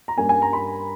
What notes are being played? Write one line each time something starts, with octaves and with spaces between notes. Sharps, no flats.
A#5
G2 G3 A#3 C#4 G#5
G#5
A#5
B5